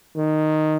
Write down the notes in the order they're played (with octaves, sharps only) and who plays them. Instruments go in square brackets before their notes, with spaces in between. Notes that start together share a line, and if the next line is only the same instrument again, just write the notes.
[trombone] D#3